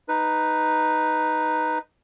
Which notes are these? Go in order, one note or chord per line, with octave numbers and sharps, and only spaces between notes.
D#4 B4